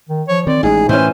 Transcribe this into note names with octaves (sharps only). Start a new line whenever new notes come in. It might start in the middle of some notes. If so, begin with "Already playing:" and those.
D#3
F3 C#5
D#3 C4 D5
A1 G#3 D#4 G#4
A2 E3 C#4 C5